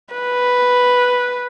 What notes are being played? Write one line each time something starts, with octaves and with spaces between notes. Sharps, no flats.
B4